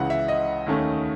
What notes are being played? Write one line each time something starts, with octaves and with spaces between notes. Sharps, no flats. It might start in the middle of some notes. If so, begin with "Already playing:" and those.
Already playing: C#2 C#3 E3 F#5
E5
D#5
D#2 D#3 A3 C#4